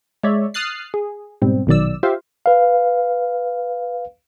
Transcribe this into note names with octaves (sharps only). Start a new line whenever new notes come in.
G#3 C#5 D5 E5
D#6 F6 F#6 A6 C7
G#4
G#2 B2 G3 C4
A#1 B2 D#3 F#3 D5 E6
F4 G4 C5 E5 F5
B4 F5